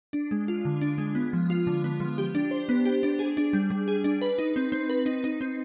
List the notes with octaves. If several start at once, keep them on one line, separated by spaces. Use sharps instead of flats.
D4
G#3
F4
D3
D4
G#3
B3
F3
F4
D3
B3
F3
G4
D4
C5
B3
G4
D4
G#4
D4
G3
G3
G#4
D4
B4
D#4
C4
C4
B4
D#4
D#4
C4